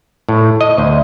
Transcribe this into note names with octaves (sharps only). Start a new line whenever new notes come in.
A2
D#5
D2